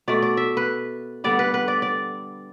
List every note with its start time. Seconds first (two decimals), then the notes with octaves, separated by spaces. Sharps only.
0.08 B2 A3 D5
0.22 D5
0.37 E5
0.57 B4
1.24 D3 G3 B3 D5
1.39 B4
1.54 B4
1.68 D5
1.82 D5